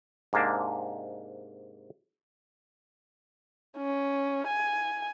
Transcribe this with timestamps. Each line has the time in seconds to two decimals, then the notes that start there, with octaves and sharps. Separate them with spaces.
0.33 G#2 C3 A#3 D4
3.78 C#4
4.47 G#5